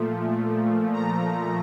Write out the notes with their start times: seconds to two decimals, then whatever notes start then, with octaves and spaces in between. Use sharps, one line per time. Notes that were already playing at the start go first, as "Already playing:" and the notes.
Already playing: A#2 F3 A3
0.93 A#5